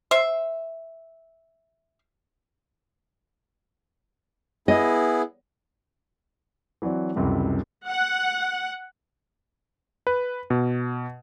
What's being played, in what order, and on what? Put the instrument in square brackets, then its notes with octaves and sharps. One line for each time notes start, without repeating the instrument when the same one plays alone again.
[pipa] C5 E5
[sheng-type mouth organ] B3 E4 G#4 [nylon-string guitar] D#5
[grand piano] E3 F#3 C4 D5
C#2 F#2 C3 E3 G3
[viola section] F#5
[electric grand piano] B4
B2